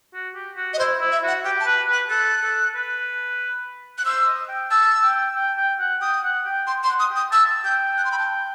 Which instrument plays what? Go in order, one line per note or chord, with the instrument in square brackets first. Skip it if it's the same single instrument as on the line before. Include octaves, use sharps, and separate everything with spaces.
[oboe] F#4
G4
F#4
[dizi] D#5
[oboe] E4 [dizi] C5
[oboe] E4
[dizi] E5
[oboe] F#4 [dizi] F#5
[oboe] G4 [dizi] G5
[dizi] A5
[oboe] B4
B4
[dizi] F#6
[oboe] A4 [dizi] F#6
[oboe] A4
B4
[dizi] F#6
[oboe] C5 [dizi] E6
[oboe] D#5
G5
[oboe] A5 [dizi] E6
[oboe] G5
G5
G5
F#5
[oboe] G5 [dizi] D#6
[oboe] F#5
G5
[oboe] G5 [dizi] C6
[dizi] C6
[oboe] F#5
[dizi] D#6
[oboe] G5
[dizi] D#6
[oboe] A5 [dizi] E6
[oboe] G5 [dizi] G6
[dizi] F#6
C6
B5
A5